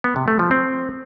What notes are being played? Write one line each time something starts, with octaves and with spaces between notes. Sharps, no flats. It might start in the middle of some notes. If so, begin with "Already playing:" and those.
B3
C3
A3
F3
C4